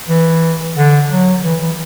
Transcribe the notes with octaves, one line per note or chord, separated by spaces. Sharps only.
E3
D3
F#3
E3
E3